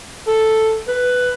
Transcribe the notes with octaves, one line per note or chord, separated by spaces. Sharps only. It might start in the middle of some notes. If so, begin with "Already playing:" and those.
A4
B4